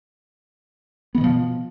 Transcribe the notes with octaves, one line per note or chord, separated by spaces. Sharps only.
B2 D#3 F3 B3